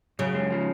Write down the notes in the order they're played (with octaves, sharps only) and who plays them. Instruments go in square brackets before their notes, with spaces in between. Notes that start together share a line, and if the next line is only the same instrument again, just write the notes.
[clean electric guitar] F#2 [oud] C#3
[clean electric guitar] G#3
F3